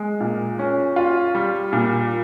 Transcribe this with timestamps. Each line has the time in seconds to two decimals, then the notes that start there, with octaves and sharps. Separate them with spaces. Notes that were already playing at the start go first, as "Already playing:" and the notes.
Already playing: G#3
0.20 A#2
0.59 C#4
0.96 F4
1.35 G3
1.73 A#2